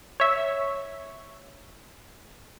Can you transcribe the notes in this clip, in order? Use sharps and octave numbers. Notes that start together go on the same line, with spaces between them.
C#5 E5